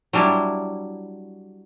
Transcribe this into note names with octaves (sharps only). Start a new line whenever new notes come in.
F#3 G3 D4 E4